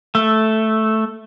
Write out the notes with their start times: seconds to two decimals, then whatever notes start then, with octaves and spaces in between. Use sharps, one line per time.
0.15 A3